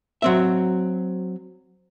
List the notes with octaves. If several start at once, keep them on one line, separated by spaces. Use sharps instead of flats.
F#3 C4 E5